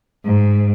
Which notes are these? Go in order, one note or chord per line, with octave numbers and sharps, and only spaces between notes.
G#2